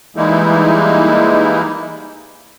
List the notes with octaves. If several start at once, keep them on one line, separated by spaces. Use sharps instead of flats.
E3 G3 G#3 A#3 D#4 E4